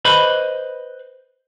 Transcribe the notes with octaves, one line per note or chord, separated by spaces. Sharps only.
B4 C5 D#5 B5